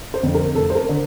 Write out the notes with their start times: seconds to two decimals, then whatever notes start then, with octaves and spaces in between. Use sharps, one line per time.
0.14 C5
0.23 F2 D3
0.35 A#4
0.55 F1 A4
0.70 C5
0.75 A#4
0.89 D3